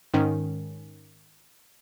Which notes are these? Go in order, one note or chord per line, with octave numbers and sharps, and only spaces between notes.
G#2 D#3 C#4